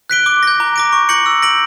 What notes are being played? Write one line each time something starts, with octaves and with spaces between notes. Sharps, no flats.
F#6 B6 D7 G7
D6
G6 A#6
A#5
D6 A#6 D7
C#6
G6 A#6 C#7 F#7
E6
A#6 D7 F#7